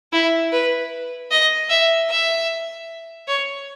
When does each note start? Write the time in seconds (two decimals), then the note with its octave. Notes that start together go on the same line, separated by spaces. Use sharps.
0.13 E4
0.52 B4
1.31 D#5
1.70 E5
2.10 E5
3.28 C#5